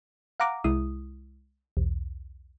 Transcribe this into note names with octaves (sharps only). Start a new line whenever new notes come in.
F5 F#5 A#5 D6
C2 G#3 E4 D#6
B1 E2